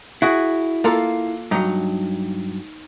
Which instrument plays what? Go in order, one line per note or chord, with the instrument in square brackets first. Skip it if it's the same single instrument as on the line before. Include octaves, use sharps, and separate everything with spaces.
[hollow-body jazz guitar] E4 [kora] F#4 G#4
[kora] A#3 F4 A4
[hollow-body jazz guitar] G2 F#3 [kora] D#4